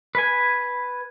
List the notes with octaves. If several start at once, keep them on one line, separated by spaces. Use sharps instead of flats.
B4 G#5